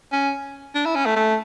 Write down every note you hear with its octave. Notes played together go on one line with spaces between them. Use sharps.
C#4
D4
E4
C#4
A3
A3